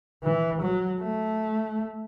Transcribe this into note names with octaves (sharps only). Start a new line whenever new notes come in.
E3
F#3
A3